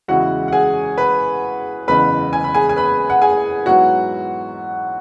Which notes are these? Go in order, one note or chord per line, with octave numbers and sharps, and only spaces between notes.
E2 C#3 G#3 E4 F#4 F#5
F#5
G#4 G#5
B4 B5
F#1 E2 C#3 G#3 B3 B4 B5
G#5
B5
G#4 G#5
G#5
B4 B5
F#5
G#4 G#5
G#2 F#3 B3 E4 F#4 F#5